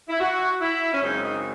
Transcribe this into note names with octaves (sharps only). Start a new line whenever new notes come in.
E4
F#4
E4
C#4
F#2 C#3 G#3 C4 D#4
D#4